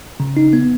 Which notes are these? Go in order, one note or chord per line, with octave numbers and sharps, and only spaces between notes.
C#3
D#4
B3